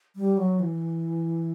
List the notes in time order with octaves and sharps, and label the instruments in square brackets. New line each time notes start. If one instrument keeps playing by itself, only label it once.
[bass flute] G3
F#3
E3